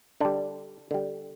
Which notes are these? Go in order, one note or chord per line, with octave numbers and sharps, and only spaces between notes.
D3 G3 D4
D3 G3 D4